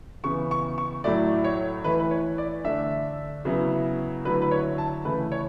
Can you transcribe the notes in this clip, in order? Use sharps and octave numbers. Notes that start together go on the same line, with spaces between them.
C#3 E3 B3 C#6
C#6
C#6
A2 F#3 A3 E4 D5
C#5
E3 A3 E4 B4
B4
C#5
D5
D3 A3 D4 E5
C#3 F#3 B3 E4
D3 F#3 A3 E4 B4
B4
C#5
A5
C#3 E3 A3 E4 B4
C#5